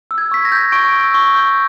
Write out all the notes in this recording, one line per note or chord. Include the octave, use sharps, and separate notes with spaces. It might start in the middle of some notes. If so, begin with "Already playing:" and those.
E6
G#6
C#6 B6
A#6
G6
C#6 D7
E6
C#6
G6